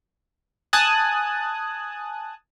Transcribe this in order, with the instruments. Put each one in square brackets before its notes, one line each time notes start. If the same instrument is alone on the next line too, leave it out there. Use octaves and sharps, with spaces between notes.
[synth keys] G#5 A5 D#6 F#6